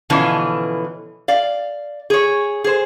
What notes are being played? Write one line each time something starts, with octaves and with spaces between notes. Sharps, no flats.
B2 D3 E3 F3 C#4
D5 F5
G#4 C#5
G#4 C5